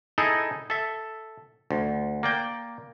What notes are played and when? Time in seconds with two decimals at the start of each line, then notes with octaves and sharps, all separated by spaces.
0.18 D#4 E4 G#4 A4 D#5
0.70 A4 E5
1.71 D2
2.23 A#3 D5 G5